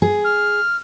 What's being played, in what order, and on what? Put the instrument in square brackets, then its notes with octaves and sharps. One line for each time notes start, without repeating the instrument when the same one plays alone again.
[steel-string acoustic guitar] G#4
[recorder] F6